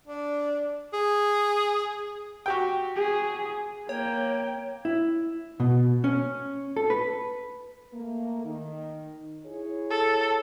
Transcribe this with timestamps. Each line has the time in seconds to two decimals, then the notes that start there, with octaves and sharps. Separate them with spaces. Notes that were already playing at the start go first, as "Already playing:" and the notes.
0.07 D4
0.93 G#4
2.46 F#4 G4 G5
2.96 G#4
3.89 A#3 C#5 G5
4.85 E4
5.60 B2
6.04 C#4
6.76 A4
6.90 B4
7.94 A3 A#3
8.44 D#3
9.46 E4 G#4 C#5
9.90 A4